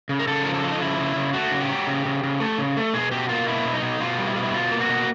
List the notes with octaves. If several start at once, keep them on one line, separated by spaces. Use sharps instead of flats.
C#3
A#4
C#3 A4
F3 A#4
A4
F3
D#4
C#3 E4
C#3
C#3
A3 F#4
C#3
G4
F#3
C#3
C#3
C#3
A3
C#3
A3
B2 G#4
B2 G4
A#3 F4
B2 E4
B2
D#4
B2
B2 F4
G3
E4
B2 F4
E4
B2 F4
A#3
F#4
B2